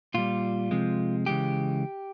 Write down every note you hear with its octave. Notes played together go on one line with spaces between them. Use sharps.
A#2 G3 F4
C3 F3 G#3
C#3 E3 G#3 G4